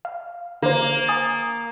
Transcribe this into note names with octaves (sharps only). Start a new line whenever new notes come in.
F5
D3 A#3 C5
G#5 D#6 A6